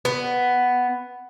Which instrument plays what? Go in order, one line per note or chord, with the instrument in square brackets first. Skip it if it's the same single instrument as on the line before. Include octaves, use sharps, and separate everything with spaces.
[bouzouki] B3